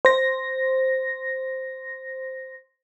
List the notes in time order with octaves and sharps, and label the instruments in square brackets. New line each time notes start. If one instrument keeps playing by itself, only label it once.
[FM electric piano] C5 A#6